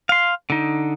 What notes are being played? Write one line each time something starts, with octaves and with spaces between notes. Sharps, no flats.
F5 C6
D3 D#4